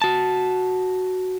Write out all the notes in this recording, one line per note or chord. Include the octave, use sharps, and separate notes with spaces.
F#4 A5